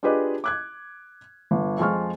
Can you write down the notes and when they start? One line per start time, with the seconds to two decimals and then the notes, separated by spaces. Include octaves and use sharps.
0.03 D4 F4 G4 G#4 B4 D#5
0.44 D6 F#6 G#6
1.51 G1
1.79 F2 F3 G#3 F4 C#6 F6